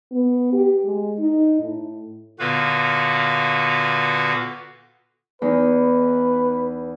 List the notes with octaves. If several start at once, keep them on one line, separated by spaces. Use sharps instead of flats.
B3
G4
G#3
D#4
A2
A#2 D3 B3 F#4 B4 F5
E2 D#4 B4